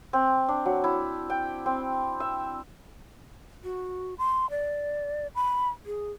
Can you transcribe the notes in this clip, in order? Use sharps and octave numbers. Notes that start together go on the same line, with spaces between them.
C4
D4
F#3
E4
G5
C4
E5
F#4
C6
D5
B5
G#4